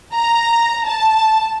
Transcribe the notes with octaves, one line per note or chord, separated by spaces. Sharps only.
A#5
A5